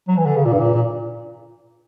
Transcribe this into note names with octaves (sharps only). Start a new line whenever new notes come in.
F#3
E3
D3
C#3
A#2
G2
A#2
A#2